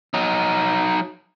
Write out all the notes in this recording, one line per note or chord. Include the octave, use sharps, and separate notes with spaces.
F#3 D#4